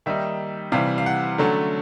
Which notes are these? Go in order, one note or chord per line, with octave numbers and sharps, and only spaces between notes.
D#3 G3 A#3 D#4 E5
C3 E3 G3 F5
F5
F#5
D3 F#3 A3 C#4